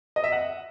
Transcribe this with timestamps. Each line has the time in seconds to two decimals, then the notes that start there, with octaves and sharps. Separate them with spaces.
0.16 D#5
0.24 E5
0.32 F#5